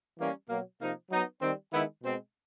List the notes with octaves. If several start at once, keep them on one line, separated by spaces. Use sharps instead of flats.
E3 G3 A#3 C#4
B2 F#3 A#3
C3 F3 A#3 D#4
F#3 B3 D#4
D#3 G3 C4
D#3 G#3 B3 E4
B2 G#3 C4